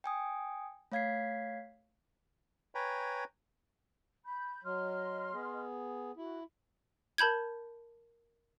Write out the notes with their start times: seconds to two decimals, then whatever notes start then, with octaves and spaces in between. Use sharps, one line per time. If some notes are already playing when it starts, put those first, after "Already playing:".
0.04 G5 G#5 D#6
0.92 A3 C#5 F5 G#6 B6 C7
2.75 B4 C#5 G5 G#5 A#5 B5
4.25 B5 G6
4.64 F#3 D#5 C6 F6
5.33 B3 G#4
6.17 E4 F#4
7.18 A#4 A5 B5 G6 G#6